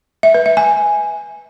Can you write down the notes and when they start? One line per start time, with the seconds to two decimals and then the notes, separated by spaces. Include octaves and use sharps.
0.23 E5
0.34 B4
0.46 E5
0.57 G#5